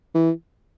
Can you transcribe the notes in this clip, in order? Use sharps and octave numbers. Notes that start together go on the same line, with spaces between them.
E3